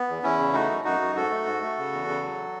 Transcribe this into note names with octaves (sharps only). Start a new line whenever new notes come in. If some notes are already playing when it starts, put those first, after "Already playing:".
Already playing: B3
E2
E2 C#4 E4
C#3
A3 D#4 F#4
F#2
F#2 D#4 F#4
F#2
G#2 F#4 A4
A3
G#2
A3
C#3
E2
C#3
F#3